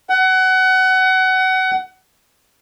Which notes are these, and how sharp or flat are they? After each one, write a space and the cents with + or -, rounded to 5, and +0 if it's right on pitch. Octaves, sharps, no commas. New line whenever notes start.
F#5 +25